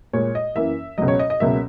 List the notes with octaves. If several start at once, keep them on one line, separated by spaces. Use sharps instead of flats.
A#2 G#3 C#5
D#5
F#2 E3 A#3 E5
C#2 B2 F#3 D#5
C#5
D#5
D#5
C#2 B2 F#3 A#3 E5